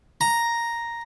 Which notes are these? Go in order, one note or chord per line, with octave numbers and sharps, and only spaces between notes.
A#5